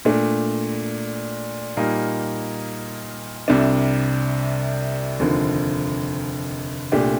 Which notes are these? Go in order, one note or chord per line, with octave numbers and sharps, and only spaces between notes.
A#2 A3 D4
A#2 G3 A#3 D#4
C2 C3 G3 D4
F1 D#2 D3 F3
C2 A#2 A3 D4 G4